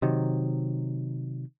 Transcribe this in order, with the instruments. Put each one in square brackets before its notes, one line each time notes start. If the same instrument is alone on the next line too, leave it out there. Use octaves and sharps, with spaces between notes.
[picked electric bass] C3 D#3 F#3